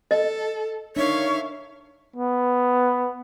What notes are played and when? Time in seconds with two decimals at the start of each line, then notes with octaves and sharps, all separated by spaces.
0.11 A4 D#5
0.96 D4 D#4 A#4 C#5 E5 F5
2.16 B3